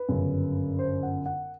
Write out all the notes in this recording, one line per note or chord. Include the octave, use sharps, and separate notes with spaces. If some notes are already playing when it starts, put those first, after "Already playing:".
Already playing: B4
G1 F#2 C#3
C5
F#5
F#5